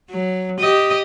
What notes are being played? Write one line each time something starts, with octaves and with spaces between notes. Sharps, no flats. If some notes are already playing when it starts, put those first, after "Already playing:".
F#3
G4 D#5